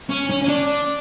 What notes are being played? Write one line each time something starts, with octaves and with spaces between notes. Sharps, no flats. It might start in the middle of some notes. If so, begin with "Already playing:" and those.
C#4
C#4
C#4
D4